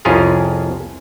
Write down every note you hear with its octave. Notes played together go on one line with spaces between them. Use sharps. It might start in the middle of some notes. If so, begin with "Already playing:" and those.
C2 F2 C#4 F4 G#4 A#4